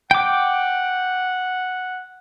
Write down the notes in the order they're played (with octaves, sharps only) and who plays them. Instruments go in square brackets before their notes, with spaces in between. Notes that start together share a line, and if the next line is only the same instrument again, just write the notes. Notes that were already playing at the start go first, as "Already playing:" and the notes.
[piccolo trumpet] F#5 [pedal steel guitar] G5 D6